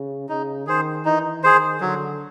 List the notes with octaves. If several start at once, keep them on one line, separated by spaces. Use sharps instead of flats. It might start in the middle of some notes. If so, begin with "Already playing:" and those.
Already playing: C#3
C#3 D#4
D#3 G#4 C5
E3 D#4
D#3 G#4 C5
D3 F#3